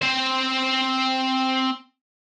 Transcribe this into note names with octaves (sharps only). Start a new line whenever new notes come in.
C4 C5